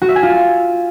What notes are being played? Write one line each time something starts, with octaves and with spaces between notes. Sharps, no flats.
F#4
E5
G#5
F4